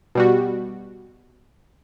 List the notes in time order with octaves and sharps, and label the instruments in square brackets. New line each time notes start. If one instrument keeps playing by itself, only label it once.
[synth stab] B2 G3 F#4